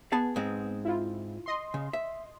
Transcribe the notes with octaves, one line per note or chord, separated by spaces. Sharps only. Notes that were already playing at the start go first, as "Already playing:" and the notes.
B3 G#4 A5
G#2 G#3 C4
E4 F4
D#5 C6
C#3
E5